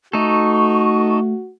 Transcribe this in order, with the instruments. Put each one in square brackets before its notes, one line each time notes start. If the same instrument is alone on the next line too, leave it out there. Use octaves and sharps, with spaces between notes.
[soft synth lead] A3 [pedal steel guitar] D#4 A4 [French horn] F#4 [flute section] C#6